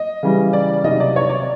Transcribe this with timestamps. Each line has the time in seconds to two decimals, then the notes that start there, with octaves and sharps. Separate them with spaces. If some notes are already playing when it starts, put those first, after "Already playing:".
Already playing: D#5
0.23 C#3 E3 G3
0.53 D5
0.84 C3 D#3 F#3 D#5
1.00 D5
1.16 C#5
1.29 D5